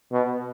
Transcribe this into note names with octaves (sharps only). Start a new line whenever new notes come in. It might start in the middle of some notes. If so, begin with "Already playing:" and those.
B2